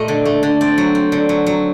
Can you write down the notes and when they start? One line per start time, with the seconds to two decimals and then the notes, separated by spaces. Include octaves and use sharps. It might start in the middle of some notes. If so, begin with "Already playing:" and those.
Already playing: A#2 A3 D#5
0.08 D3
0.25 A3
0.43 D3
0.61 C4 D5
0.78 F#3
0.95 C4
1.12 D3
1.29 F#3
1.46 F#3